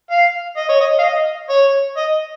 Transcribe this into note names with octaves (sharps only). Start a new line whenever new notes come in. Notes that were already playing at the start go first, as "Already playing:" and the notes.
F5
D#5
C#5
D#5
F5
D#5
C#5
D#5